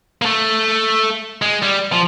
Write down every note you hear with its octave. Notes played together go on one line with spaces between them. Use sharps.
A#3
A3
G#3
G3
F3